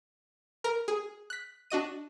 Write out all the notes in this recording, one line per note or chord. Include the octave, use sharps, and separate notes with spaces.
A#4 A#5
G#4
F#6 B6
D4 F#4 D#5 D#7